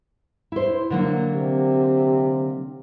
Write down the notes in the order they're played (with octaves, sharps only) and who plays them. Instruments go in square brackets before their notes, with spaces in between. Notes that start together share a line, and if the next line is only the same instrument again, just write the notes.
[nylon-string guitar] E4 C5
D3 F#3 A#3
[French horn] C3